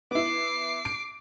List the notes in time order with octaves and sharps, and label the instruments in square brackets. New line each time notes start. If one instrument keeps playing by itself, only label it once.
[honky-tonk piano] B3 E4 [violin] D6 C7
[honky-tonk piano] D7